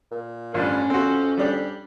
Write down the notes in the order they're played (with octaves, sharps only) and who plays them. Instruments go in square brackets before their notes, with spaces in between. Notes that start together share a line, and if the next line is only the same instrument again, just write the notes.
[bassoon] A#2
[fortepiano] A1 G2 F3 [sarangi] C#4 [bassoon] D4
[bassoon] F2 [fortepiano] C4 F#4
[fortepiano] G3 D4 G4